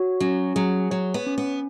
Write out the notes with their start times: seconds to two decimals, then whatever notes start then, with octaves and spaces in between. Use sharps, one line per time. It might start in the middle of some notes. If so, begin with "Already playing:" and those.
Already playing: F#4 C#5
0.20 F#3 C#4
0.56 F#3 G#4
0.91 F#3 C#5
1.14 B3
1.26 C#4
1.38 B3